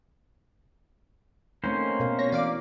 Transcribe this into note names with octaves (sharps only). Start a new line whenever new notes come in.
A3 A#3 C4 C#4 D#4 C5
B2 A#4 F5
C#5 A#6
E3 D5 F5 D6